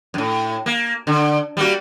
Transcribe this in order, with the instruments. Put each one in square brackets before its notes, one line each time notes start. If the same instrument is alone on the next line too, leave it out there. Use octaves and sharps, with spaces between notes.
[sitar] F#2 A2
A#3
D3
G3 A#3 F#4